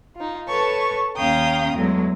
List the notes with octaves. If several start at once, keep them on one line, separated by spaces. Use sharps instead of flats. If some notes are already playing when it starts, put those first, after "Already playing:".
D#4 F4
A4 B4 C#5 A5 C#6
D#2 C#4 F5 G5 A#5 D#6
E2 F#3 G#3 A3